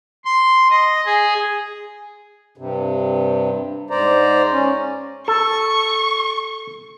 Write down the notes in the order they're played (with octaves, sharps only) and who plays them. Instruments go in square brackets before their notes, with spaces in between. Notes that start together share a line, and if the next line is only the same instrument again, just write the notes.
[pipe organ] C6
D#5
G#4
[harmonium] G2 C3
G#2 C5 D5 A#5
C#4
[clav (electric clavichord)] A4 [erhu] C#6